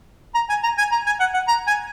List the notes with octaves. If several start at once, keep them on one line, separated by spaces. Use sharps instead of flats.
A#5
G#5
A#5
G#5
A#5
G#5
F#5
F#5
A#5
G#5